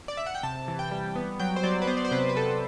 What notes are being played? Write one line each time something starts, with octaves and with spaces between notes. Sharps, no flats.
D5
E5
F#5
G5
C3 A5
E3
G5
G3
B3
F#3 G5
C5
F#3 D5
B4
B3 C5
D5
C5
C3 B4
B4
C3 A4